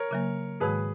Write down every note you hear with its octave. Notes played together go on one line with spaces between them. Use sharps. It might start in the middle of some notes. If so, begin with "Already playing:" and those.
Already playing: A#4 C#5
C#3 F#3 A#3
G#2 D#3 G#3 G#4 B4